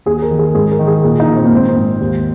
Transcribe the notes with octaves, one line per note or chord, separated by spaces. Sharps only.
D#2 G#4
A#4
D#3
G#4
G#2 G#4
A#4
D#3
G#4
A#2 G#4
D#4
A#2
C4
A#3
G#1 C4
G#2
D#2